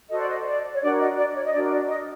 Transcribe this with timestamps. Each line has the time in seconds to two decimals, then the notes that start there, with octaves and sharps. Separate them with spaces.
0.10 F#4 A4 C5 D#5
0.19 D5
0.28 D#5
0.45 D5
0.73 C#5
0.81 D4 F#4 A#4 D5
0.99 D#5
1.17 D5
1.34 C#5
1.45 D#5
1.52 D4 F#4 A#4 D5
1.70 D5
1.88 D#5